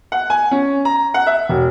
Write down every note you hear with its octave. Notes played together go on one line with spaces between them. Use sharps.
F#5
G#5
C#4
A#5
F#5
E5
E1